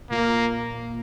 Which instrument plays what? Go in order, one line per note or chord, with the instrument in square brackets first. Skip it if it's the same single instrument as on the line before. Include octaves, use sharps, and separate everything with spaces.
[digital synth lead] A#2 [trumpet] A#3